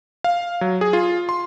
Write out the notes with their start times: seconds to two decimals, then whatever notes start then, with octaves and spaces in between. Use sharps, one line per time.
0.24 F5
0.61 F#3
0.81 G#4
0.93 F4
1.29 C6